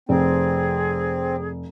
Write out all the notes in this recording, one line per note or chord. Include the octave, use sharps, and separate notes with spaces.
F1 C4 G#4